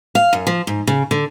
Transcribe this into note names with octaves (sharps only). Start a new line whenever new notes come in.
F5
F#2
F3
G#2
C#3
D3